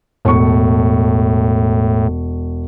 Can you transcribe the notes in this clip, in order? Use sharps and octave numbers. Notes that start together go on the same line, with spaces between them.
E1 A2 C#6